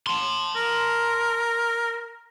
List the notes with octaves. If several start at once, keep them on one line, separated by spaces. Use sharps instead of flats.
A5 C6
A#4